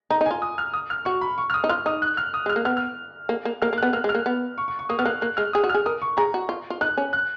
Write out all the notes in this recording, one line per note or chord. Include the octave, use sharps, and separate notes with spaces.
D#4 A#5
D#4
G#5
F4
D#6
F6
D#6
F6
F#4 C#6
B5
C#6
F6
D#6
D#4
F4 F6
D#4 D#6
F#6
F6
D#6
G#3 F6
A#3
B3 F6
F6
A#3
A#3
A#3 F6
A#3
F#6
B3
A#3 F6
G#3
F6
A#3
B3
C#6
C#6
C#6
A#3 D#6
B3 F6
A#3 F#6
A#3 F#6
G#3 F6
G#4 D#6
F#4
F6
G#4
A#4 D#6
C#6
G#4 A#5
F#4
F4
F4
D#4 F#6
C#4
F#6